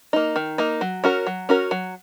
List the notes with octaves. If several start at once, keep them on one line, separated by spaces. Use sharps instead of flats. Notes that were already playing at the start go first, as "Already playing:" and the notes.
A#3 D#4
D#3
A#3 D#4
F#3
C#4 F#4 A#4
F#3
C#4 F#4 A#4
F#3